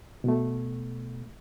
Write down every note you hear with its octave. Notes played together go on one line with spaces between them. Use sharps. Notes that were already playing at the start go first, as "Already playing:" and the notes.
B2 A3